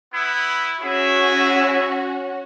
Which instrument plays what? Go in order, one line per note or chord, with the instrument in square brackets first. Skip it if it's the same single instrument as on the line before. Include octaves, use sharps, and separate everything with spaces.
[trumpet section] B3 E4
[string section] C#4 F#4 [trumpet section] E4 G#4 E5